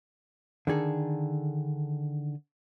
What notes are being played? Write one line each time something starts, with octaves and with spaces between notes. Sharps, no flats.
D3 D#3 G#4 A4